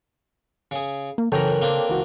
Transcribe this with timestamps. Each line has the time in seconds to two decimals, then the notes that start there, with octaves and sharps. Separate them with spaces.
0.71 C#3 G#4
1.18 A#3
1.32 F#2 C#3 E3 A4 A#4 C#5 G5
1.62 A#3 C4 D4
1.89 C#2 E3 F#4